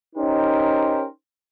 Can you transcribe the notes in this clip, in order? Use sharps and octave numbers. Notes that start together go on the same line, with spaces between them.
C#4 D#4 G4 A#4 C5